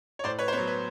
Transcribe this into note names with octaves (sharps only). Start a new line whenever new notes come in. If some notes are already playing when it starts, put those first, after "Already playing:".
C#5
A2 C5 D5
B4 C#5
C5
F#3 B3 B4 C#5
B4